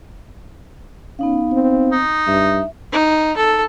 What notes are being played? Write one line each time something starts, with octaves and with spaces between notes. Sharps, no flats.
B3 C#4 D#4 F5
C4
D#4
G2 E5
D#4
A4